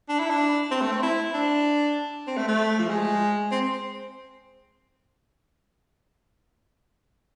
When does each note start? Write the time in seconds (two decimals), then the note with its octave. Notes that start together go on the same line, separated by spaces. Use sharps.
0.09 D4
0.19 E4
0.30 D4
0.71 C4
0.82 A3
0.92 C4
1.03 E4
1.34 D4
2.27 C4
2.37 A3
2.48 A3
2.79 F3
2.89 G#3
3.51 C4